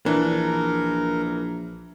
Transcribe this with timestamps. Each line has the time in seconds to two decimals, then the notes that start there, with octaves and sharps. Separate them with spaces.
0.06 A#1 E3 D4 A#4